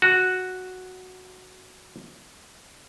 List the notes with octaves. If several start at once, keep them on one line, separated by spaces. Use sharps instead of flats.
F#4 F#6